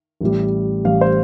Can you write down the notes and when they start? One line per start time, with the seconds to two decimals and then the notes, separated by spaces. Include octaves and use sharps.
0.21 A1 A2 G3
0.85 A1 A2 G3 F5
1.01 C5